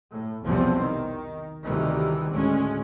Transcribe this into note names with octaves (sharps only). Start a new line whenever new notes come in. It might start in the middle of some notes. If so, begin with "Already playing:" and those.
A2
F1 B1 E2 F3 G3 C4
D#3
D2 C3 D#3 E3 G3
D2 A2 G#3 C#4